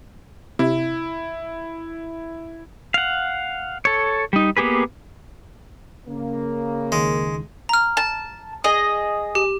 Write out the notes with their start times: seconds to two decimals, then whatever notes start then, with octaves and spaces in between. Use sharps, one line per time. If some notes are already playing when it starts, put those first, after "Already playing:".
0.59 C3 E4
2.94 F5 F#5
3.85 A4 C#5
4.33 G3 D#4
4.57 A#3 B3 G4 G#4 B4
6.07 C#3 A#3
6.92 C#2 D#3 G#3
7.69 A#5 F6
7.97 A5
8.64 G#4 D#5
9.35 G4